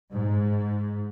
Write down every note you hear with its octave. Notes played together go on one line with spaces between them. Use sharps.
G#2